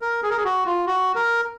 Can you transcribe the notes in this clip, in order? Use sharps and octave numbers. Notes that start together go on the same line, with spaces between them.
A#4
G#4
A#4
G#4
F#4
F4
F#4
A#4